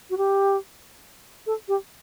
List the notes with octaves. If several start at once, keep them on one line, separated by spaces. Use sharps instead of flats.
F#4
G4
A4
G4